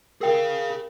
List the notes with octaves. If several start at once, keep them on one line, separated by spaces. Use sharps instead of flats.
G#4 A#4 F5 G5